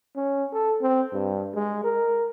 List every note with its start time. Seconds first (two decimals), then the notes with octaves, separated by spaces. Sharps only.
0.17 C#4
0.53 A4
0.82 C4
1.13 G2
1.55 G#3
1.84 A#4